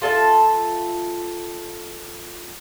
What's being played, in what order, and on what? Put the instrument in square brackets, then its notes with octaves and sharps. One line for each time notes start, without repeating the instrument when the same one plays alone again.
[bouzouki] F4 A4 E5 A5